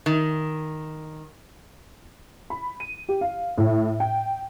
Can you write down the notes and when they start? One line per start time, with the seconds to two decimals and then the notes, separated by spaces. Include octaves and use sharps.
0.06 D#3
2.50 B5
2.80 D#7
3.09 G4
3.21 F5
3.58 A2
4.00 G5